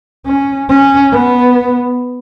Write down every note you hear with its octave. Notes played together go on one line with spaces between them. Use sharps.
C#4
C#4
B3